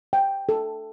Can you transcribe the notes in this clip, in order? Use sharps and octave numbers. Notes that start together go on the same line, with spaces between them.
G5
A4